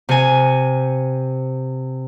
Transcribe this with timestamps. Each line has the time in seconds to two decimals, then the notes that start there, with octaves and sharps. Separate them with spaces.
0.09 C3 G#5